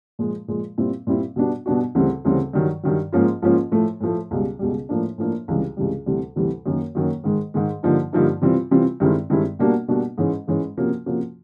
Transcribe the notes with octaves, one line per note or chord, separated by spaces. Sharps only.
A#2 F3 G#3
A#2 F3 G#3
A#2 G3 C4 E4
A#2 G3 C4 E4
B2 G3 B3 D4 F#4
B2 G3 B3 D4 F#4
D2 C#3 E3 G3 C4
D2 C#3 E3 G3 C4
G2 D#3 F#3
G2 D#3 F#3
G#2 F3 A#3 C#4 F4
G#2 F3 A#3 C#4 F4
A2 F3 A3
A2 F3 A3
C#2 B2 G3
C#2 B2 G3
A2 F3 A#3 D4
A2 F3 A#3 D4
C#2 C3 E3 G3
C#2 C3 E3 G3
D2 C3 E3 G3
D2 C3 E3 G3
F#2 D#3 F#3 A#3
F#2 D#3 F#3 A#3
G#2 D#3 G#3
G#2 D#3 G#3
G2 D3 F3 A#3 D#4
G2 D3 F3 A#3 D#4
C3 E3 G3 C4 F4
C3 E3 G3 C4 F4
G2 D#3 G#3 C4 E4
G2 D#3 G#3 C4 E4
B2 G3 A#3 D4 F#4
B2 G3 A#3 D4 F#4
G#2 E3 G#3 C#4
G#2 E3 G#3 C#4
C3 F3 A#3 C#4 F#4
C3 F3 A#3 C#4 F#4